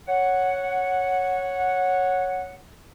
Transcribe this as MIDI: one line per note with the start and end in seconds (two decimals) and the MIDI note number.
0.08 2.56 73
0.08 2.56 78